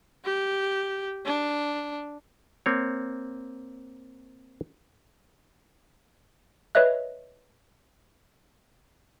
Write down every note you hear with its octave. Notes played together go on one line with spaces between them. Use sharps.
G4
D4
A#3 C4 C#5
B4 C#5 D#5 E5 F#6